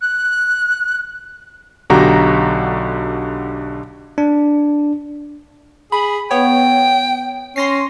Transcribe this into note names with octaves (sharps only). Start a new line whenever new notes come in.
F#6
B1 D3 F#4 G4 A#5
D4
G#4 B5
B3 C#5 G5
C#4 C6 A#6 C7